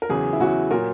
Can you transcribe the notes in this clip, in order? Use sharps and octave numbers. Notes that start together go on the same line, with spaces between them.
A#4
E2 C#3 F#3 G#4
E4
E2 C#3 F#3 F#4
A#2 F#3 A#4